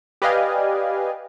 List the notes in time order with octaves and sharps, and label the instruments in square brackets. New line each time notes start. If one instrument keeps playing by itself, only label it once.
[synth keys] G4 B4 D5 D#5 F5 G#5